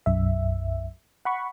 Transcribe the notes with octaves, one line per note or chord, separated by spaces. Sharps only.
B1 F#2 E5
F#5 B5 C#6